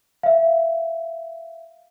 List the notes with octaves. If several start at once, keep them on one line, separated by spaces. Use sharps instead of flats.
E5 F5